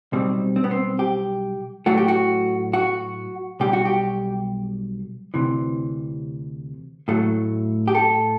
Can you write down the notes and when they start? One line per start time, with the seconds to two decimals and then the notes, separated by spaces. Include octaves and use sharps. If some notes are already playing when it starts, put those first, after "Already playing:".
0.12 B1 B2 G3 C4
0.56 C4
0.64 B3
0.71 C4
0.99 G4
1.86 A2 F#3 A3 F#4
1.98 G4
2.08 F#4
2.73 F#4
3.60 B1 B2 G3 G4
3.73 F#4
3.85 G4
5.34 D2 C3 E3
7.08 A2 F#3 A3
7.88 G4
7.95 A4